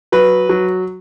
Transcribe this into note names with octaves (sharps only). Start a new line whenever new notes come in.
F#3 B4
F#3